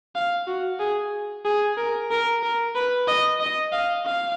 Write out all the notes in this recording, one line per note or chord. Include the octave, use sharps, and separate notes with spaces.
F5
F#4
G#4
G#4
A#4
A#4
A#4
B4
D#5
D#5
F5
F5